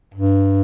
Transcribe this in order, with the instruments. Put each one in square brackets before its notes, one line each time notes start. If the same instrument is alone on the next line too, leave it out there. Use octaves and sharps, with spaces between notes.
[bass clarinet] G2